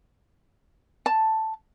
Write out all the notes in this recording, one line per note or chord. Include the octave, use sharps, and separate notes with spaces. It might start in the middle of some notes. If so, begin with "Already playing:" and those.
A5